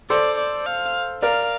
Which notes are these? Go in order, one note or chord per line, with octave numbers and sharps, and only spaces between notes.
A4 C5 D5
D5
F5
A#4 D5 F5